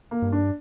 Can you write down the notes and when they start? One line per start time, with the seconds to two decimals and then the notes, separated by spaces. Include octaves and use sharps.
0.11 A#3
0.22 G2
0.32 D4